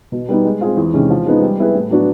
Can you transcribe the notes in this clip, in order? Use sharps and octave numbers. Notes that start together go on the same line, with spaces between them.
B2
G3 B3 D#4
G#3
C4 F4 G#4
E2
C3 D#3 G#3 C#4
F3
G#3 B3 D#4
G3
B3 E4 G#4 B4
A2
F#3 B3 D4 F#4